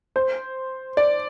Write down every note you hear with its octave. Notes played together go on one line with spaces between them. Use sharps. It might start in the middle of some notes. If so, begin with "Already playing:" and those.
C5
D5